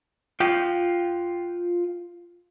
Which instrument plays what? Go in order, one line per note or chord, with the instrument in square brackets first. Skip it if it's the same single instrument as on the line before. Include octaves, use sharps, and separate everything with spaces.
[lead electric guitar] F4 G5